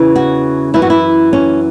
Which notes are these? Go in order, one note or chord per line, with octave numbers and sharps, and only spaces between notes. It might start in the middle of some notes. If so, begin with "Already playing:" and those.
Already playing: E2 C#3 E3
F#4
F#2 E3 E4
F#4
E4
C#4